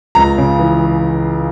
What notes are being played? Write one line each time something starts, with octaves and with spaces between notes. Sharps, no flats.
C#2 A#5
C#3
E3